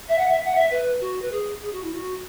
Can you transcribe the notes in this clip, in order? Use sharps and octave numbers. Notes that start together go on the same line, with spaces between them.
E5
F#5
E5
F#5
E5
B4
F#4
B4
G#4
G#4
F#4
E4
F#4